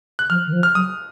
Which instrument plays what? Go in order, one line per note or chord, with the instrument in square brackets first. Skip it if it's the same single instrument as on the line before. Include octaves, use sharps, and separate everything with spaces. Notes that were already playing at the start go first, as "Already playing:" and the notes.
[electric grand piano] F#6
[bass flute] F3 [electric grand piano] F6
[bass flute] D#3
F3
[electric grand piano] F6
[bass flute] F#3 [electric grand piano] D#6